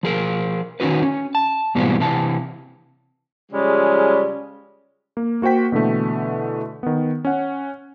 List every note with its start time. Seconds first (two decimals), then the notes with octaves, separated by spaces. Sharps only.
0.03 F3 G#4 A#4
0.80 D#3 C#4 D#4 F#4 B4
1.03 C#4
1.35 A5
1.75 G#2 B2 E3 G3 A#3 C4
2.00 C3 E3 A5
3.52 C#3 F3 G3 G#3 C#4
5.17 A#3
5.42 A#3 F#4 C5 G5 B6
5.72 B2 D3 E3 A3
6.83 D#3 B3
7.25 C#4 F#5